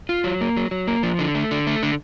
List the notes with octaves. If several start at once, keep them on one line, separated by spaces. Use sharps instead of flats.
F4
F#3
A#3
F#3
F#3
A#3
F3
D3
A3
D3
A3
D3